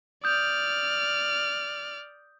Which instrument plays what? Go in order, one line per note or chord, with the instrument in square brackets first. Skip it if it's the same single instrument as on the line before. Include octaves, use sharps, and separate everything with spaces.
[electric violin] D5 F6 [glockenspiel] D#6 G6